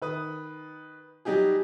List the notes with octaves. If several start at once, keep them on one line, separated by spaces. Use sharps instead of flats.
D#3 B4 D#6
F#3 G3 D#4 G4 G#4